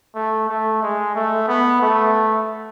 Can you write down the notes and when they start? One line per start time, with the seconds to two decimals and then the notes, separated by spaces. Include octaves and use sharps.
0.15 A3
0.49 A3
0.82 G#3
1.15 A3
1.48 B3
1.81 A3